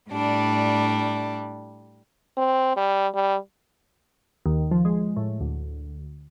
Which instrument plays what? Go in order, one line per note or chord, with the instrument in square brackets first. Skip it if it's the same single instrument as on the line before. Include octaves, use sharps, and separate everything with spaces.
[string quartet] A2 G3 D4
[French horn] C4
G3
G3
[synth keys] D#2
F3
G#3
A2
D2